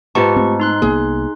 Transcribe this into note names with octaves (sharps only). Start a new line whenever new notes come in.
G#2 B3 F4 G4 A5 C#6
A3 C4
D#4 C6 F#6
C2 A#3 B3 G#4